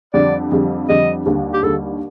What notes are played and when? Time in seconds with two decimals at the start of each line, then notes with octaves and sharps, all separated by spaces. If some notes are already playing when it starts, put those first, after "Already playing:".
0.14 F2 D3 G3 D5
0.52 F2 D3 G3
0.89 F2 D3 G3 D#5
1.26 D#2 D3 G3
1.53 G4
1.63 D#2 D3 G3 A4